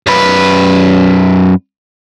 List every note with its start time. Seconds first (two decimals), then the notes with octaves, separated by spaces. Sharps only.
0.07 F#2 B4